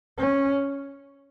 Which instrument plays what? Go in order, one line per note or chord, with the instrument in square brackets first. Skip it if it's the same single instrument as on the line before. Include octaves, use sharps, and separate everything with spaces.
[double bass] C#4